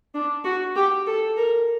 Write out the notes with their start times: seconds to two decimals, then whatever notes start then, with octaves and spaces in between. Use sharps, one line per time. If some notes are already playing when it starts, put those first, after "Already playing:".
0.14 D4
0.45 F#4
0.76 G4
1.07 A4
1.37 A#4